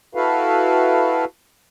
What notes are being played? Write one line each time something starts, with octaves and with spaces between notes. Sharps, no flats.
E4 F#4 A4 B4 F5